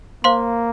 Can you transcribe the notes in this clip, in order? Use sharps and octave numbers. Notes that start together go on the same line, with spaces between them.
A#3 C5 F5 C6